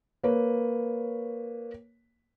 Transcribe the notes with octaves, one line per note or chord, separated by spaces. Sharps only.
A#3 B4 C#5